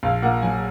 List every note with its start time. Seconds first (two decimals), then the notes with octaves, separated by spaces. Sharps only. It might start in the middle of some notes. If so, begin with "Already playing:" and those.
0.03 A#1 F5
0.22 A#2 F#5
0.42 F#3 G#5